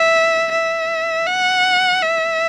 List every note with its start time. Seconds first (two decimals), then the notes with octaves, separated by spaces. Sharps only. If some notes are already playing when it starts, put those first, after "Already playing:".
Already playing: E5
0.52 E5
1.27 F#5
2.03 E5